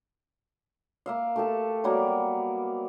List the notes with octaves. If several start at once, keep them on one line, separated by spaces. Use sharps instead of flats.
A#3 E5 F5
A3 G4 A5
F#3 G3 A#3 B3